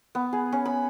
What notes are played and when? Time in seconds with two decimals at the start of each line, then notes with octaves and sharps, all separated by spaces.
0.15 B3
0.33 G#4
0.52 C#4
0.65 B5